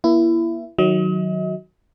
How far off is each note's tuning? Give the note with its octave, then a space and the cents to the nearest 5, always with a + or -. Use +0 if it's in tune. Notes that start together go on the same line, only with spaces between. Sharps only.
A#3 +40 E4 +20
D#3 +10 F#3 +0 D#5 +40